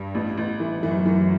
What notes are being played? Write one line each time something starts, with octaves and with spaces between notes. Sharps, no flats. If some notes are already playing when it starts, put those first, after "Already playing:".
Already playing: G2
A1
A1
E3
F#2 E3
E3